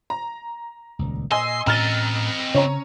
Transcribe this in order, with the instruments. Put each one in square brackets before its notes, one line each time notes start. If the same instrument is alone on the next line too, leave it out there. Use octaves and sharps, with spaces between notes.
[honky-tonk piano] A#5
[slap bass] D#1 C#2
[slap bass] A#2 [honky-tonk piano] D#5 G#5 E6 [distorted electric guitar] C6
[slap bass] A2 C#4 [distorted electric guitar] C4 D#5 [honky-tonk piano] A#5 F6 A6
[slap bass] C#3 [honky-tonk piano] C#4 C#5 A#5